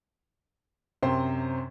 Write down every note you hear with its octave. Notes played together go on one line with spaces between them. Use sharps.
F#2 C3 C5 G5 C6